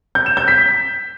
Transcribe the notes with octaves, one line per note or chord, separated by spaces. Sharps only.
G6
E7
G6
B6